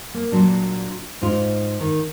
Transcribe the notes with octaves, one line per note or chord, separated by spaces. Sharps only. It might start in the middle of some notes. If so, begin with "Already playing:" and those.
A#3
A#2 F#3 D4
G#2 F4
D#3